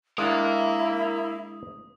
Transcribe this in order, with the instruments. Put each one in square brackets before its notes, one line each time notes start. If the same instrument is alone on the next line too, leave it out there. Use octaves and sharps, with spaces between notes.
[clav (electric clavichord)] G#3 D4 F#5 [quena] E4 [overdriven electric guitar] A#4 F5 [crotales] D#6